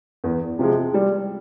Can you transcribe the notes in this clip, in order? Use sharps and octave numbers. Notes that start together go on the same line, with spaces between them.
E2
C3 F3 G#3
G3